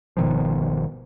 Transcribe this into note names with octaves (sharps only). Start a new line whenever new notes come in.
G1 B2 D#3 F3